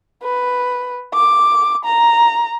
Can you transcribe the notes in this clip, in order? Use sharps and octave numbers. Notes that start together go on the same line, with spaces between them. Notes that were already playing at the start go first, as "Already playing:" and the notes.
B4
D6
A#5